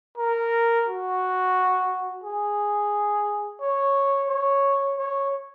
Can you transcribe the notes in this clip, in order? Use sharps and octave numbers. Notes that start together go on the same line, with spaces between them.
A#4
F#4
G#4
C#5
C#5
C#5